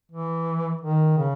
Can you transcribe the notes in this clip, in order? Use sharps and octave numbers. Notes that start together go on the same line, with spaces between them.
E3
D#3
C#3